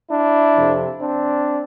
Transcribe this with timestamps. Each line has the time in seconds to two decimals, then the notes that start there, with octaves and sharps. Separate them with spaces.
0.11 D4 E4
0.55 F2 C3 F3
1.00 C4 D4